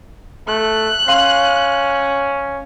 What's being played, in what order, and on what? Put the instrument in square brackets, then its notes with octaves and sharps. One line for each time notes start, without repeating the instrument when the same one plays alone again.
[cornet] A3 [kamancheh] F#6
[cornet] C#4 [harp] F5 C6 D#7